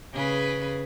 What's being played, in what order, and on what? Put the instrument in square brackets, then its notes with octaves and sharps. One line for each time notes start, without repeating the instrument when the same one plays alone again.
[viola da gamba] C#3 G#4 B4